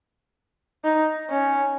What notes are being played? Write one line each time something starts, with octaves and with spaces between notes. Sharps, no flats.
D#4
C#4